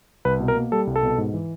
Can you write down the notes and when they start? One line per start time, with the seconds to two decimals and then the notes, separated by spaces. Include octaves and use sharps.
0.25 C2 B4
0.40 B2
0.48 A#4
0.56 A#3
0.72 G3 A4
0.87 C2
0.96 A4
1.03 B2
1.18 G#2
1.34 E3